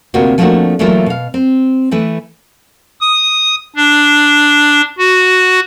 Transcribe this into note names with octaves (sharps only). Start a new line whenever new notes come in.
D2 C3 A#3 F4 F#4
F3 A3 A#3 C4 D4 F#4
E3 F#3 A3 A#3 E4 F4
B2 F5
C4
E3 A3 B4
D#6
D4
F#4